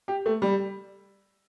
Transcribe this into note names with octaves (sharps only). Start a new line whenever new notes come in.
G4
A3
G3